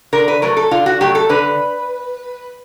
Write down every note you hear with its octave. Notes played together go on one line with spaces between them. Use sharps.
D3 A#4
B4
F#3 A3 A#4
A4
D3 F4
F#4
F#3 A3 G4
A4
D3 B4